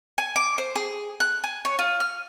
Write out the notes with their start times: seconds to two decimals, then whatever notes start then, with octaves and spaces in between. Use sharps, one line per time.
0.18 G#5
0.36 D6
0.58 C5
0.76 G#4
1.20 F#6
1.44 G#5
1.65 C#5
1.79 F4
2.00 F6